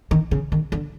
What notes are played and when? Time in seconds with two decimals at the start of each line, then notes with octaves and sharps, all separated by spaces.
0.11 D#3
0.31 C#3
0.52 D#3
0.72 D3